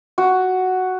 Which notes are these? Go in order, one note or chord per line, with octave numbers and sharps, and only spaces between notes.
F#4